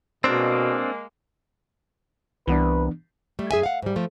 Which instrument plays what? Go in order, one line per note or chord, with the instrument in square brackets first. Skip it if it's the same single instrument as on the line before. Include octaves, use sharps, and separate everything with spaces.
[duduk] B2 [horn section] G#3 A#3 [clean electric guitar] C4 D4
[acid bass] C2 [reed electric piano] E3 B3 D4 [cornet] B4
[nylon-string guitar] G3 A3
F#2 G#4 E5 G#5
F5 F#5
G#2 G3
F3 A3